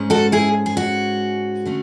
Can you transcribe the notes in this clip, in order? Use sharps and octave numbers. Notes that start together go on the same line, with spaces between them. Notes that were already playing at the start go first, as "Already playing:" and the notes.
Already playing: G#2 G#3 C#4
F#4 A4
E4 G#4
G#4
F#4
D3 A3 C#4